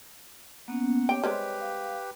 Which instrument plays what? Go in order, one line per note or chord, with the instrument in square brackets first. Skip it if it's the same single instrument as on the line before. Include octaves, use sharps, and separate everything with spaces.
[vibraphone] A#3 B3 C#4 [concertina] F#5
[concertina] G4 [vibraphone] C#5 [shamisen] G5
[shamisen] G3 G#3 C4 [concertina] G4 B4
[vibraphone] F5